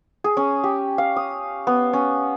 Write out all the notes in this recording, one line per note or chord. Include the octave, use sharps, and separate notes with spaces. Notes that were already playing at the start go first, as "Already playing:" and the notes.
G#4
C#4
G4
F5
D#6
B3
C#4